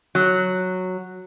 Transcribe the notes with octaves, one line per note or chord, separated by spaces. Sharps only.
F#3